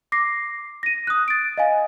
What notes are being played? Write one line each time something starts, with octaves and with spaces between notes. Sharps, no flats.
D6 A#6 C7
A#6 D#7
D#6 F#6
A6 D7
D#5 F5 G#5